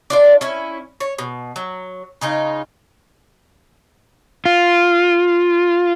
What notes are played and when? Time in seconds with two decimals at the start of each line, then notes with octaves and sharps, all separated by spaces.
0.10 D4 F4 D5
0.41 C#4 E4
1.00 C#5
1.19 B2
1.56 F#3
2.21 C#3 D#4 F4
4.46 F4